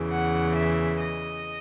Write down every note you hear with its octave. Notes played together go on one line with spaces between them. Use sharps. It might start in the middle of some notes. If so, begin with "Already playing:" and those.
Already playing: E2 C#3 E3
F#5
E5
D#5